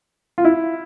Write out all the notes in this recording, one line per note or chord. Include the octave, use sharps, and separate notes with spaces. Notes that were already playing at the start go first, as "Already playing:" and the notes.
F4
E4